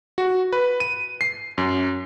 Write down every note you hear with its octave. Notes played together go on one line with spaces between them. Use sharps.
F#4
B4
D#7
C7
F#2